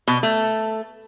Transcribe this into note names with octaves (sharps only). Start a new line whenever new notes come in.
B2
A3